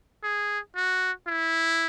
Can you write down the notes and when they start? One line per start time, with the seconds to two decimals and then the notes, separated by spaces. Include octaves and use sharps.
0.23 G#4
0.76 F#4
1.27 E4